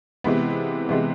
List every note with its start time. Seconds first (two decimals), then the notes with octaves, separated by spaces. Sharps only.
0.24 C3 E3 G#3 B3
0.89 C3 E3 G#3 B3